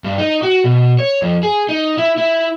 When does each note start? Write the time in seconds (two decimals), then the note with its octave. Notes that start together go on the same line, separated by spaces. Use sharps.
0.04 G2
0.18 D#4
0.43 F#4
0.64 B2
0.99 C#5
1.22 F2
1.43 G#4
1.69 D#4
1.98 E4
2.18 E4